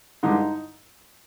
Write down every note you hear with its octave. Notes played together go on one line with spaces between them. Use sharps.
G2 D3 G#3 D#4